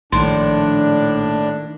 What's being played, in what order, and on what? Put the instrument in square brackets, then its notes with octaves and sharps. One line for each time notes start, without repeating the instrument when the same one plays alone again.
[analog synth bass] A#1 [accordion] A2 D4 [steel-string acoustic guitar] D#3 [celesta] C6